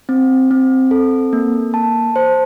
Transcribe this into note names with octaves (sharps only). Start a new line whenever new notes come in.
C4
C4
A4
A#3
A5
C5